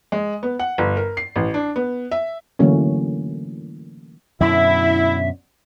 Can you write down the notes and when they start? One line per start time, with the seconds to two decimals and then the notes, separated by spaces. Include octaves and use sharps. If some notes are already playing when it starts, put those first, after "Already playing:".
0.12 G#3
0.43 B3
0.59 F#5
0.78 G1
0.97 A#4
1.17 C7
1.36 A1
1.54 D4
1.76 B3
2.11 E5
2.59 D3 E3 F#3 A3 A#3 C#4
4.40 F#2 B2 D3 E4 E5